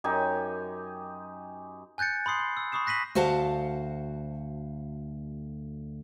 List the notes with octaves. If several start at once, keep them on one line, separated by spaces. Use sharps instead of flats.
F#2 D#4 G4 G#5
G#5 F#6 G6 A6 C#7
B5 C6 D#6 C7
C6
E6
B5 C#6 D#6 C7 E7
F#6 A#6 B6 D#7 F#7
D2 F#4 C5 F5 F#5 A5